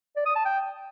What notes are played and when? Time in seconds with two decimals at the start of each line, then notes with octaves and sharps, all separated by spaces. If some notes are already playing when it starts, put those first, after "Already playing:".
0.16 D5
0.26 D#6
0.35 A5
0.45 G5